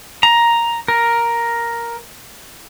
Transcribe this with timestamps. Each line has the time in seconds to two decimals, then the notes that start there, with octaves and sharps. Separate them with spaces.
0.23 A#5
0.88 A#4